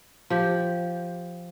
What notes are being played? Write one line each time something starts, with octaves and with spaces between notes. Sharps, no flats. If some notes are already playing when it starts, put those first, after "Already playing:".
F3 G4